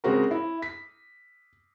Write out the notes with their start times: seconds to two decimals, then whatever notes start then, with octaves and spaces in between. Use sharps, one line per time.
0.04 C#3 G#3 C4 F#4 A#4
0.31 E4
0.62 B6